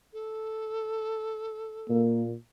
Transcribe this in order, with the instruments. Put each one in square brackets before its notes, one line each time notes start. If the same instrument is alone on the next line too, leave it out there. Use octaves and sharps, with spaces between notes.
[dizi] A4
[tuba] A#2 [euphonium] A#3